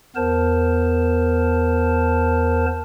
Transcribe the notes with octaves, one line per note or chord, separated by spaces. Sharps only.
E2 B3 A#4 C5 A5